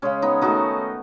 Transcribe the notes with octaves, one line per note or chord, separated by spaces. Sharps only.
C#3 G#3 C#4
B3 D#4
D#3 A3 D#4 F#4